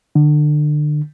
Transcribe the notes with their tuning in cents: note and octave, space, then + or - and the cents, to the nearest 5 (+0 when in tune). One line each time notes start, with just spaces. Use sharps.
D3 +30